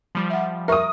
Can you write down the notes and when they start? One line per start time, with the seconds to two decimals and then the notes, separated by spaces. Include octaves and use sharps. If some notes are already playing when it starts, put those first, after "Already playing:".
0.15 F3 G3
0.30 E5 F#5
0.68 A#4 E5 C#6 D#6